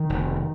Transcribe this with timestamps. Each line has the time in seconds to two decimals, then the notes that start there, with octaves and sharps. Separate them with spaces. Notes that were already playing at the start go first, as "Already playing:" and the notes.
Already playing: D#3
0.10 F1